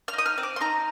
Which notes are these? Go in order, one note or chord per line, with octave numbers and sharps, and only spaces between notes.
F6
D#4
D#6
F6
C4
D6
C6
D#4 A#5